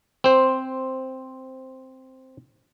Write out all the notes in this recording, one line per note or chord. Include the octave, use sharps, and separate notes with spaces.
C4 C5